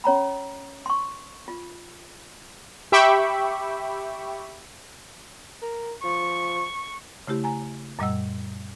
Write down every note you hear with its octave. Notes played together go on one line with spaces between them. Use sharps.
C#4 C#5 A#5 B5
C6 C#6
F4
G4 E5 G5 B5 C#6 D6
A#4
F3 C#6
C#3 A3 E4 G4
G#5 A#5
F#2 A#2 G3 D#5 F#5 E6